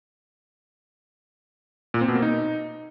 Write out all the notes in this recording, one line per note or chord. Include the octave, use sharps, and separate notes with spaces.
A#2
C4
B2
A#3
D#4